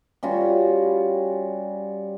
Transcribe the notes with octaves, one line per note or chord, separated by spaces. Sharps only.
G3 C#4 F4 F#4